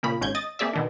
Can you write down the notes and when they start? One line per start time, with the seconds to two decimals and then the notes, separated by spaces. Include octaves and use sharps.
0.03 A#2 C#3 A#3 B5
0.21 G#1 G#2 C#4 G6 G#6
0.35 D#5 D#6 A6
0.59 A#3 C4 G#4 D5 E5
0.73 B2 D#3 D4